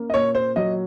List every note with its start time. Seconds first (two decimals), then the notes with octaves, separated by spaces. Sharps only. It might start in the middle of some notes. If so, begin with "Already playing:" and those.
Already playing: A#3 C#4
0.10 D#5
0.14 A#2 C#5
0.35 C5
0.56 F#3 D#5